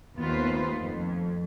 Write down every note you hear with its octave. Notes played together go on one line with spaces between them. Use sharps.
D#2 A3 B3 F4 B4 C5
F2